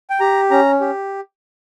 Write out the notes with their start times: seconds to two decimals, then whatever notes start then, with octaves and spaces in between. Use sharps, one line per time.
0.10 G5
0.20 G4 A#5
0.51 C#4 A#5
0.81 G4